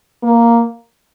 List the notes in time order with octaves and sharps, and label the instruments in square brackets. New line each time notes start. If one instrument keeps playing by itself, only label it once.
[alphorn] A#3